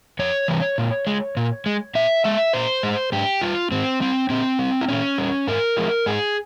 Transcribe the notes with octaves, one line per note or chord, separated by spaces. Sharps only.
F2 C#5
C3 E3 G3
A#2
G#3
A#2
G#3
A#2 E5
G#3 E5
A#2 C5
G#3
G#2 G4
G3 F4
G#2 C4
G3 C4
A#2 C4
G3
E4
A#2 C#4
G3
G#2 A#4
F3 G#3
G#2 G#4